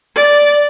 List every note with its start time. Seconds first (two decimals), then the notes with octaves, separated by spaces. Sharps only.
0.16 D5